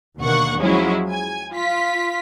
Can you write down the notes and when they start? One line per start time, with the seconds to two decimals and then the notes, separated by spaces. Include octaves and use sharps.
0.19 D#2 B2 D3 A#3 F#5 C#6
0.58 F3 F#3 G#3 C#4 E4
1.10 G#5
1.54 F4 B6